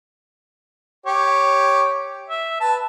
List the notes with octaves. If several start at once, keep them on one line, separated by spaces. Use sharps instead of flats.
G4 C#5
E5
B4 A5